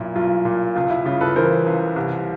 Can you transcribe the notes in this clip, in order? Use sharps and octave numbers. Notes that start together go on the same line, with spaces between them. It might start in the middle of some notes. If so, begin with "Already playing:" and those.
Already playing: B1 A#2 E4
B1 F4
A#2
C#2 F4
E4
C#3 F4
A4 B4
E3 A#4 C5
C#2
C2